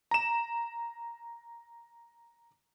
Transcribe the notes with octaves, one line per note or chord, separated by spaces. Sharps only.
A#5 E7